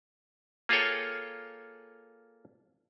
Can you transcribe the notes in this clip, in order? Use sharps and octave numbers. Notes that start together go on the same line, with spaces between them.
A#3 F4 G#4 A4 C#5 G5